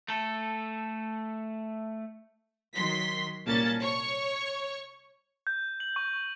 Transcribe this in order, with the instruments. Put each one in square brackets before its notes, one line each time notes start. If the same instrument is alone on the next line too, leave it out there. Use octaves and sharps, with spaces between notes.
[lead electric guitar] A3 A4
[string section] D#3 F#3 C6 B6
C2 A#2 A#3 C#4 A5 A6
C#5 C#6
[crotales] G6
F#7
C#6